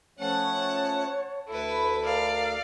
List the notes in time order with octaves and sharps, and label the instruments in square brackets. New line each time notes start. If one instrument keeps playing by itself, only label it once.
[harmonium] F3 A3 C#4 [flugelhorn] C#5 [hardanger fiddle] F#5 A5
[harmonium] D2 A4 [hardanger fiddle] E4 B4
[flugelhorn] A#4 [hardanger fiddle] D5 [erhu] F5